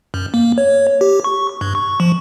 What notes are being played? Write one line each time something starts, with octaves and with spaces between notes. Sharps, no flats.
F#2
A#3
C#5
G4
C#6
G2
C#6
F3